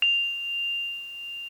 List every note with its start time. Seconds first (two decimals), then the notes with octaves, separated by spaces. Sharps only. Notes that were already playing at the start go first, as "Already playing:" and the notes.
0.02 F7